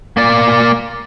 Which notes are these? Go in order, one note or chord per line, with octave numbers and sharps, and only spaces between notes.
A#3 D5